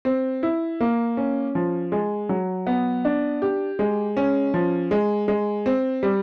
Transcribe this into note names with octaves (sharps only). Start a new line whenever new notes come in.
C4
E4
A#3
C#4
F3
G#3
F#3
B3
D4
G4
G#3
C#4
F3
G#3
G#3
C4
G3